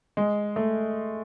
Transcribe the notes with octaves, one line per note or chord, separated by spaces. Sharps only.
G#3
A3